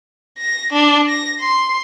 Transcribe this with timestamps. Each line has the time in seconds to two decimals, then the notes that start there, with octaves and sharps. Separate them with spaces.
0.38 A#6
0.72 D4
1.08 A#6
1.40 C6